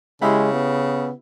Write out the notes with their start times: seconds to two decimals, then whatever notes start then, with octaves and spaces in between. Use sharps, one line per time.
0.22 C#3 G#3 E4 G4 B5
0.53 B3